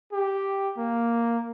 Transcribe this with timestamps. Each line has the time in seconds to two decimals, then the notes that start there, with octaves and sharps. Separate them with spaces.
0.12 G4
0.77 A#3